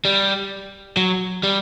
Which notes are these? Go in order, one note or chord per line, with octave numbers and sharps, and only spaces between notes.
G3
F#3
G3